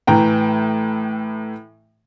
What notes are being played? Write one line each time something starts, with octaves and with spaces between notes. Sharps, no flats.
A2 E3 G5 A#5